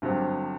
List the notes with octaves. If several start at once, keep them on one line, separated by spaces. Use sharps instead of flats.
G1 G2 F#3 C4 G4